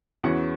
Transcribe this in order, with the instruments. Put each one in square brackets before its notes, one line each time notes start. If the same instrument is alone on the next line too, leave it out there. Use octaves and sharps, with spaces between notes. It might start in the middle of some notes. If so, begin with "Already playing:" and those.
[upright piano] E2 E3 C#4 F#4 F#5